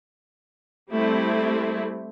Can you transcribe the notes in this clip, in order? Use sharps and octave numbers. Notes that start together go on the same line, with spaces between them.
G3 A3 C4 E4